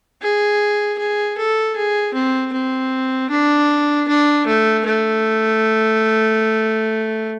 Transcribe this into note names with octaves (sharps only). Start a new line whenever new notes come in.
G#4
G#4
A4
G#4
C4
C4
D4
D4
A3
A3